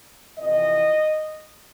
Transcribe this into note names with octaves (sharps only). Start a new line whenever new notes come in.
F2 C3 E3 D#5